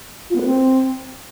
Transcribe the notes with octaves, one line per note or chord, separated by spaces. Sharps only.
F4
B3
B4
C4